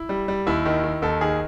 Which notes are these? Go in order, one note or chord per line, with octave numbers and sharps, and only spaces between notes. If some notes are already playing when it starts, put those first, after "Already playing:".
Already playing: E4
G3
G3
D#2 E4
D#3
D#3
D#2 A4
D#3 G#4